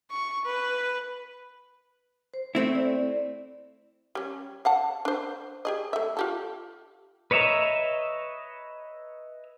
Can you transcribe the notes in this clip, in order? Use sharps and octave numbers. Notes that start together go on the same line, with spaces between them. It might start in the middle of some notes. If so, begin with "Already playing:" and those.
C#6
B4
C5
A3 C4 E4
D5
G3 C#4
F5 F#5 A5
D4 C5
G4 G#4 D#5
A3 E5
F4 G4 A4
B4 C#5 D#5 E5 A#5